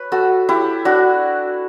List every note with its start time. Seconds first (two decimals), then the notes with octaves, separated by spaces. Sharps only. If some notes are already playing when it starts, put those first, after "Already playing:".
Already playing: B4 C#5
0.12 F#4 A4
0.49 E4 G4
0.85 D4 F#4